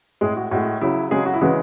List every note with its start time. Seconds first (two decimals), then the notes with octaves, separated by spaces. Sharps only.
0.21 A2 G#3 G#4
0.37 F#4
0.51 A2 G#3 F#4
0.81 C#3 F#3 E4
1.11 C#3 F#3 G#3 G#4
1.26 F#4
1.34 E4
1.41 C#3 E3 G#3 F#4